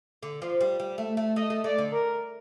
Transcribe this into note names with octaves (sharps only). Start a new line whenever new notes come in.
D3
F3
G3
G3
A3
A3
A3 D#5
A3
A3 D5
D3
A#4